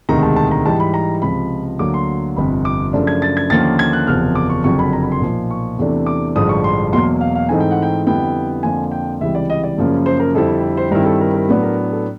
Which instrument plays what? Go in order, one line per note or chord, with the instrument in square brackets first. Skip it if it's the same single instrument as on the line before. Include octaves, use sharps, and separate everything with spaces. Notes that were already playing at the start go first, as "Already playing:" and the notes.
[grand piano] E1 D2 C3 D#3 G#3 A#5
A5
A5
A#5
G#2 E3 G3 A5
B5
A#5
C#2 C3 F3 B5
D2 D3 F#3 A#3 D6
C6
G1 F2 C3 B5
D6
F#2 C#3 F3 A3 D4
G#6
A6
G#6
D#2 D3 F3 A#3 C#4 A6
G#6
F#6
F#1 E2 C3 F3 F6
D6
C#6
F#1 F2 D3 F#3 C#6
B5
A#5
B5
C6
B1 A#2 F3
C#6
E2 C3 E3 A3 D4
D6
A1 G2 D3 F3 G#3 D#6
C#6
C6
E2 B2 F#3 A#3 C6
F5
F5
G#2 E3 A3 C4 D#4 G#5
G5
F#5
G5
F2 D3 G3 B3 E4 G5
F2 D3 F3 A#3 G#5
G5
C#2 C3 E3 G3 E5
D5
D#5
D5
F#2 C#3 F3 A#3 C#4
C5
A#4
F2 D3 G3 C4 E4 A4
C5
G2 D#3 G3 C4 E4 A#4
A4
A#4
A#4
A2 F#3 B3 D4 B4
A#4
A4